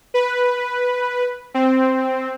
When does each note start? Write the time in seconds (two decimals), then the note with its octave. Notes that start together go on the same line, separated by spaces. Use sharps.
0.14 B4
1.54 C4